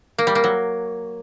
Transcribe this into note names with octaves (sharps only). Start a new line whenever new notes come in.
A#3
G3
A#3
F#3